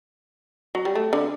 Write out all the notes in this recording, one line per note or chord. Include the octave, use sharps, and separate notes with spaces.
F#3
G3
A3
D3